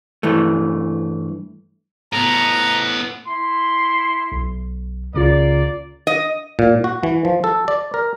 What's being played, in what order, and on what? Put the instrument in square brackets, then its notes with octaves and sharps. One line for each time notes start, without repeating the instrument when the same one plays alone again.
[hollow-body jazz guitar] G2 E3 A3
[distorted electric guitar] A2 B3 [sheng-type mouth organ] A#5
[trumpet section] E4 C6
[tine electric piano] B1
[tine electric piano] C#2 C#3 F4 [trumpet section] A#3 D5
[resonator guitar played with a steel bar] D#5
[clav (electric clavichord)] A#2
F#4
E3
F3
A4
D5
A#4